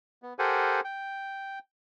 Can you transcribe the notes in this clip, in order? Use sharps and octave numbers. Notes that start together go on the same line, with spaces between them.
B3
G4 A4 A#4 C5 F#5 G#5
G5